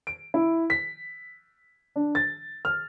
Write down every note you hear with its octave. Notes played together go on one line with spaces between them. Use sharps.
D7
E4
B6
D4
A6
F6